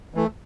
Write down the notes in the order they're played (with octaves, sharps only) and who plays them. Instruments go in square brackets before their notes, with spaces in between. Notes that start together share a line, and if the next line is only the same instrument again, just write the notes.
[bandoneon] E3 A3